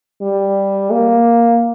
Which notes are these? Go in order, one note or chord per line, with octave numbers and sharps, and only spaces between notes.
G3
A#3